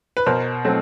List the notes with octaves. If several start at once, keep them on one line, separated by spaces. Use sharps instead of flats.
B4
B2 A#4 C5
F#3 A3 C4